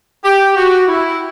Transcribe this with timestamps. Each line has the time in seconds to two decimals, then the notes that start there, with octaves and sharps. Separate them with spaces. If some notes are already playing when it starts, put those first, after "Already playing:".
0.24 G4
0.56 F#4
0.88 E4